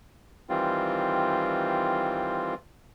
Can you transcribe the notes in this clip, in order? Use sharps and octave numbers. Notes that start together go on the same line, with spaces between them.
D#3 E3 G3 C4 F4